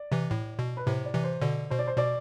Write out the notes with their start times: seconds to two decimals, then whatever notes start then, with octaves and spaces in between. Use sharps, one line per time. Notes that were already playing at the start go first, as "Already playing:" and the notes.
Already playing: D5
0.12 C3 E3
0.31 A2
0.59 B2
0.77 B4
0.86 A2 C3 C5
1.05 D5
1.14 C3 E3
1.24 C5
1.42 B2 D3 D5
1.70 B2 C5
1.79 D5
1.87 C5
1.97 B2 D5